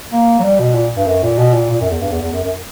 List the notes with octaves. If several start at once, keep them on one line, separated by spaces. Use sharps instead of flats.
A#3
F#3
G3
B2
A#2
G2
F#2
A#2
B2
A#2
A#2
F#2
E2
G2
E2
E2
F#2
F#2